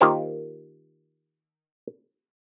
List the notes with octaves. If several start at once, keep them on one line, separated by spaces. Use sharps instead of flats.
D#3 A#3 F4 G4 A#4 C5